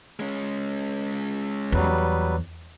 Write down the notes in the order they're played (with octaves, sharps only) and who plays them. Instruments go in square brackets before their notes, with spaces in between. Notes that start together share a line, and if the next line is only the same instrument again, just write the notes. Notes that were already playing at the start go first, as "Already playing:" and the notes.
[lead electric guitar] G#3 C#4
[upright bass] E2 [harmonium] F#3 G3 B4